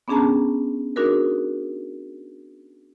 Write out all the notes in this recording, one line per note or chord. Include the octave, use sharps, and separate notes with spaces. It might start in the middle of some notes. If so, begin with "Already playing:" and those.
B3 C#4 D4 G#4 A5 A#5
D4 D#4 F#4 G#4 A#4 B4